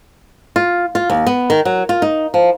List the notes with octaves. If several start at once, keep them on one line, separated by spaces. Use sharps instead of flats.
F4
F4
D#2
B3
D#3
F#3
F4
D#4
F3